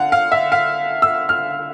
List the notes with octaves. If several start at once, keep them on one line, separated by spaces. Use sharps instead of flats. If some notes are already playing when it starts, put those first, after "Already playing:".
Already playing: D3 F5 F#5
F5
E5
F5
E6
F6